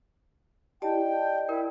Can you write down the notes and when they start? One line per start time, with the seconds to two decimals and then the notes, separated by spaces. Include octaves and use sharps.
0.82 E4 G4 D5 D#5 G5 A5
1.48 E4 A#4 D5 G5